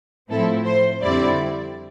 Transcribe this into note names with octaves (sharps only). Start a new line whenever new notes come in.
A2 F3 C4 E4 A4
C5
F2 D3 G3 C4 E4 D5